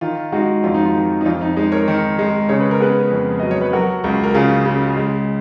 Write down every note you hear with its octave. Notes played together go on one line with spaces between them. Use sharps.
D#3 F4
G#3 D#4 F#4
F2 F4
D#4
F4
D#3
D#4
F2 F4
D#4
G#3 D#4
A#4 C#5
D#3
G#3
C#3 C#5
B4
A#4
B3 G#4 B4
F2
F#3 D#5
C#5
B4
F#3 F#4 A#4
C#2
A#4
C#3 F4 G#4
C#3
G#3